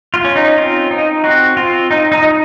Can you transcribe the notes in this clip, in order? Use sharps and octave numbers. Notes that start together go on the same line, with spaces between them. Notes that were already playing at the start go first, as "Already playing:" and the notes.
F4
C#4
D#4
C4 F4
D#4
C4 F#4
C4 F4
D#4
D#4
D#4